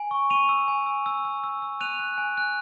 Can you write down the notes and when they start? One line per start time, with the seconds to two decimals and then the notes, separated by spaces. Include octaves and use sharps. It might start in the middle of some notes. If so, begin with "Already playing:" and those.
Already playing: G#5
0.11 C#6
0.30 C#6 D#7 F7
0.49 E6
0.68 G#5
0.86 E6
1.06 E6
1.25 E6
1.44 E6
1.62 E6
1.80 F#6 D#7 F7
1.99 F#6
2.18 G#5
2.37 F#6